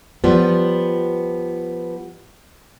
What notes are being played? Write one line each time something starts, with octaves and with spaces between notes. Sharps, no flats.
F3 G3 B3